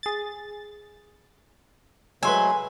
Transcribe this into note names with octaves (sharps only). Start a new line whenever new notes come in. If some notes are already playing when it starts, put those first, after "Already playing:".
G#4 A6
F#3 G#3 A3 B4 G#5 C6 E6